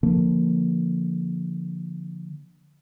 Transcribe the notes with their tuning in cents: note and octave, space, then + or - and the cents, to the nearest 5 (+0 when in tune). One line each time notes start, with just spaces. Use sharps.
D3 +0 F3 +0 A#3 +0